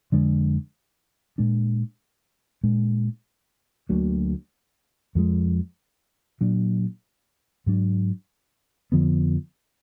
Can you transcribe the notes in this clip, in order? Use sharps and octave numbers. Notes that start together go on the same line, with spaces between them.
F2 D3 G#3 D4
A#2 G#3 D4
A#2 G#3 D4
D2 D3 F#3 A#3
F2 F3 G#3
A#2 F#3 D4
G#2 F#3 D4
F2 D3 F3 B3